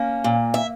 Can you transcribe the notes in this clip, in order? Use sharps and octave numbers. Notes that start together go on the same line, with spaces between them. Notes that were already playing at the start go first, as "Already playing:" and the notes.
Already playing: A#3 C#4
A#2
E5